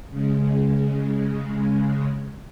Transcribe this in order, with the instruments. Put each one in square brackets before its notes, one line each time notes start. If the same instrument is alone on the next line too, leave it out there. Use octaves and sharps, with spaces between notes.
[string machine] C#3 G#3